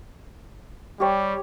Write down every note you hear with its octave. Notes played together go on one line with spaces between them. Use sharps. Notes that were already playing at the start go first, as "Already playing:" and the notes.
G3 G4 C#5